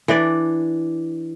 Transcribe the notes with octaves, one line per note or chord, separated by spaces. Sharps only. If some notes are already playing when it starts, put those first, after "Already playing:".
E3 D4 D5